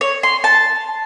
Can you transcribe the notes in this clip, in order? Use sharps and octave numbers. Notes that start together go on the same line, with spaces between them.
C#5
C6
A5